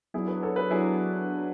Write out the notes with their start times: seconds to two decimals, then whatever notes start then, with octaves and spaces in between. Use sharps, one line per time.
0.14 F#3 B3 D4 E4 G#4
0.27 G#4 B4
0.43 A4 C#5
0.56 G#4 B4
0.70 F#3 B3 D4 E4 G#4